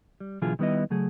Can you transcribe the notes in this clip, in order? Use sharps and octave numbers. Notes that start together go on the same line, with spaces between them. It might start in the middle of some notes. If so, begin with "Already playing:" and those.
G3
B2 D3 E3 F#3 F4 G#4
D#3 G3 B3 E4 D#5
C#3 F#3 A3 G#4